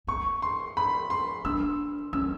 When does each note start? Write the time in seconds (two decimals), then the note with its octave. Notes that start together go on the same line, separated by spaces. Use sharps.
0.07 C4 C#6
0.42 C6
0.77 B5
1.10 C6
1.45 D4 E6
2.13 C#4 E6